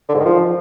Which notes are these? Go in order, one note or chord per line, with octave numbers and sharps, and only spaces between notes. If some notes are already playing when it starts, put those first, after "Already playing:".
D3
G#2
D#3
F3